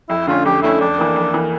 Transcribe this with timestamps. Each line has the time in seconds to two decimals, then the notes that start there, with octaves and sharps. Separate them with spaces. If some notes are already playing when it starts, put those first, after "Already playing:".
0.09 F2 E4
0.27 D3 A3 C#4 F4
0.46 F2 G4
0.62 D3 A3 C#4 E4
0.80 F2 D4
0.98 E3 A#3
1.16 F2
1.34 E3 A#3